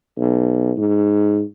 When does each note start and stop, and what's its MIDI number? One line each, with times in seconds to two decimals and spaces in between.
0.18 0.72 35
0.77 1.42 44